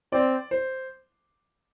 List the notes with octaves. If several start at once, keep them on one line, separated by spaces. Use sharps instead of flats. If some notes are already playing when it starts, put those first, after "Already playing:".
C4 D5
C5